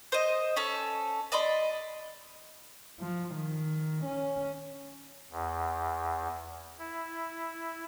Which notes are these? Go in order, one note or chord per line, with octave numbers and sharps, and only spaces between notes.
C5 D#5
C#4 A4
D5 D#5 B5 C6
F3
D#3
C#4
E2
E4